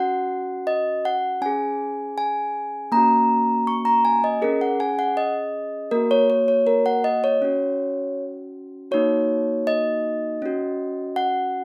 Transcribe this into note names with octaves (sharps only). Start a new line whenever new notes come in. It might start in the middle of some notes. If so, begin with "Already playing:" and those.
Already playing: C#4 F#4 F#5
D#5
F#5
C#4 G#4 G#5
G#5
A#3 C#4 F#4 A#5
C#6
A#5
G#5
D#5
C#4 G#4 A#4
F#5
G#5
F#5
D#5
A#3 F#4 A#4
C#5
C#5
C#5
A#4
F#5
D#5
C#5
C#4 F#4
A#3 D#4 F#4 C#5
D#5
C#4 F#4
F#5